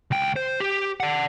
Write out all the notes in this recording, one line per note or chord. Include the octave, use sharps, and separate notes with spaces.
C#2 G5
C5
G4
D5 F#5